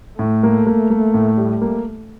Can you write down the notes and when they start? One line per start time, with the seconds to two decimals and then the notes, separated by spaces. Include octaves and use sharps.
0.19 A2 A3
0.43 A#3
0.67 A#3
0.90 A#3
1.14 A2
1.37 G3
1.62 A#3